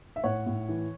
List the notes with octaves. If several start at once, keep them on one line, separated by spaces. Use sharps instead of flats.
E5
A2 C#5 F#5
A2
E3